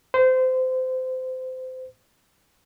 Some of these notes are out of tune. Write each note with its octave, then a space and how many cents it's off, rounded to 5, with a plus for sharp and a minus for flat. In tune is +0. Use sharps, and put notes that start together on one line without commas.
C5 -25